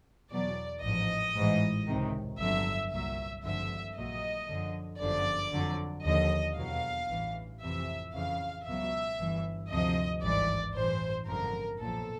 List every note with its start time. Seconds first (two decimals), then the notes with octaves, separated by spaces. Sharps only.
0.31 E2 B2 F#3 D5
0.82 A1 G#2 F3 D#5
1.35 A1 G#2 E3
1.87 C#2 C3 D#3
2.39 G1 F2 D3 F#3 E5
2.91 C2 A#2 F#3 E5
3.44 G#1 G2 D3 F3 E5
3.96 A#1 A#2 F#3 D#5
4.49 F#2 D3 F3
5.00 G1 F#2 D3 F3 D5
5.53 F2 D3 F#3
6.05 D#2 D3 F3 D#5
6.57 E2 B2 F#3 F5
7.09 A1 G2 E3
7.61 F2 C3 E3 E5
8.14 F2 C#3 E3 F5
8.66 C#2 B2 F#3 E5
9.19 G1 G2 E3
9.71 D2 C3 F3 D#5
10.23 G#1 G2 E3 D5
10.75 A1 G2 E3 C5
11.27 G#1 F#2 D3 F3 A#4
11.80 B1 A#2 F3 A4